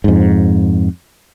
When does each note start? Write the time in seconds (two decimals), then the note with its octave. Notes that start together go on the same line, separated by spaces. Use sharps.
0.04 F2 G#2